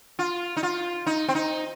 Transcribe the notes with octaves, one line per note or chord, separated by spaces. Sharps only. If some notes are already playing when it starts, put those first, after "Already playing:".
F4
D#4
F4
D#4
C4
D#4